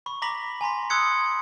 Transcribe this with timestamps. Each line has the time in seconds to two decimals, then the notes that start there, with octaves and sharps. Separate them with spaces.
0.06 B5 C#6
0.22 A#5 B5 D6 A#6 B6 F#7
0.61 G#5 A#5 C6 B6
0.90 C6 D#6 E6 F#6 G#6 C#7